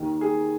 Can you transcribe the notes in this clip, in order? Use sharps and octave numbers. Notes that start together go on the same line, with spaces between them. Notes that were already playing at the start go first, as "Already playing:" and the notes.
Already playing: D#2 D#3
G#4